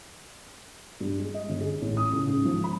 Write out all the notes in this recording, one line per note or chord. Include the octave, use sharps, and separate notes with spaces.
G2
G#3
D#5
G1
G#4
A1
D#6
C#2
G#2
F3
B5